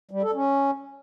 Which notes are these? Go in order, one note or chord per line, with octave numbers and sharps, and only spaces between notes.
G3
A4
C#4